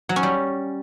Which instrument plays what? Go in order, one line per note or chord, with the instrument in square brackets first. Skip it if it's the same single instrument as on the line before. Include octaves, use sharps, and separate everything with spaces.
[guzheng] F#3
C#4
G3